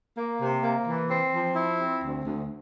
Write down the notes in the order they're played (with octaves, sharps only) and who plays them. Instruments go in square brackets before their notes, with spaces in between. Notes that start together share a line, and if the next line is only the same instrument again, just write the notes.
[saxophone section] A#3
C3
A#3
E3
C4
F3
E4
C4
D2
D2